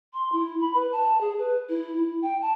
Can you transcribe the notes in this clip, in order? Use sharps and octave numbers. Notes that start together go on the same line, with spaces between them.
C6
E4
B5
B4
A5
G#4
B4
E4
E4
G5
A5